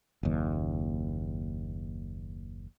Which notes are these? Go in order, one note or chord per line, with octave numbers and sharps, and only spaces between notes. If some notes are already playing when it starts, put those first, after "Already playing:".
F#1 D#2